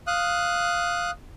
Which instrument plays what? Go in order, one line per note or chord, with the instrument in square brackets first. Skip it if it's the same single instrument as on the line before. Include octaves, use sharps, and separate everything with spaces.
[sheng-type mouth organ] F5 D#6 F#6